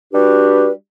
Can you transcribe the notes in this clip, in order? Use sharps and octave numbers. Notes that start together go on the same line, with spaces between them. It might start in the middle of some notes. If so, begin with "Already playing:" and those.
G3 D4 F#4 G4 B4